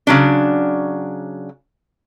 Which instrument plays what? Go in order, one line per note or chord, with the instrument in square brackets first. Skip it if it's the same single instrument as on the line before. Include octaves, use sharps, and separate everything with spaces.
[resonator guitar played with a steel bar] C#3 F#3 D4